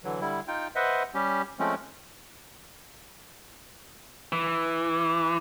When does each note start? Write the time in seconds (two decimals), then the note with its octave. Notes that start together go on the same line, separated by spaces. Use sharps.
0.04 D3 E3 F#3
0.21 D3 G3 E4
0.48 D#4 F4 G5
0.76 B4 C5 D#5 E5 F#5
1.15 G3 C#4 G4
1.59 F3 G#3 A3 C4 C#4
4.32 E3